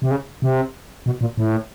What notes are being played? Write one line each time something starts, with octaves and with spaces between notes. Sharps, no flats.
C3
C#3
C3
B2
A#2
A2